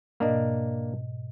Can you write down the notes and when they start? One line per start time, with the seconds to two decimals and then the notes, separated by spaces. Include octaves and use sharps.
0.20 G#2 B2 A#3 D4 D#5